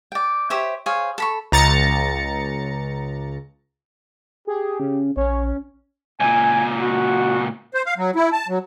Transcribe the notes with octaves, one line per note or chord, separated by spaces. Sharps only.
D5 G5
G4 C5 C#5 E5
G#4 C5 C#5 F5
A4 B5 C#6
C#2 A#5 A6 C#7
G4 G#4
C#3
A#1 C#4 C#5
C#2 A#2 G#5
F#4
C5
F5
F#3
E4
A5
F#3